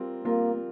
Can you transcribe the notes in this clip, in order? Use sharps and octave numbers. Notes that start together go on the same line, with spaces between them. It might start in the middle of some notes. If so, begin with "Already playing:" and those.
Already playing: G3 C4 F4 A#4
G3 A#3 C4 F4 A#4